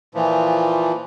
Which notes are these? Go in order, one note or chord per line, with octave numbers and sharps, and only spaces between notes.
A#2 E3 F3